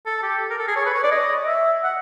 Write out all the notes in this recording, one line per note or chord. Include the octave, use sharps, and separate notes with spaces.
A4
G4
A#4
A4
G#4
C#5
B4
C#5
D5
D#5
E5
F#5